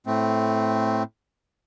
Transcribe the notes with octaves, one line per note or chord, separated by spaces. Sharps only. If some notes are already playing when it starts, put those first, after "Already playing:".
A2 A3 C4